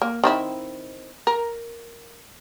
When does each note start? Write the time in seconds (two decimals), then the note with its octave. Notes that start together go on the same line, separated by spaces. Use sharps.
0.02 A#3
0.24 D#3 C4 E4
1.27 A#4